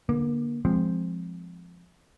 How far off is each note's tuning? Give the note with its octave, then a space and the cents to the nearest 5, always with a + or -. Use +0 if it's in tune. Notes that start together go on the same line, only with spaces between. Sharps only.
D3 +5 A#3 +30
F3 +0 G#3 +0 C4 +0